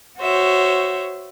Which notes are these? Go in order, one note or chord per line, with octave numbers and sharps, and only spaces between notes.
F#4 C5 C#5 E5